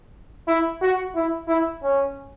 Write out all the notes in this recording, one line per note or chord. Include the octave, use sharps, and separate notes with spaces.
E4
F#4
E4
E4
C#4